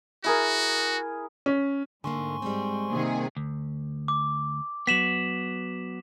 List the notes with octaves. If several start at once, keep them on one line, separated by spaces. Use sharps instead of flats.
E4 F#4 G#4 A#4
C#4
G#2 D3 A3 A#3 G#5 C6 C#6
G3 G#3 C4
C3 D#3 A#3 G#4
D2
D6
F#3 B3 B6 E7 F#7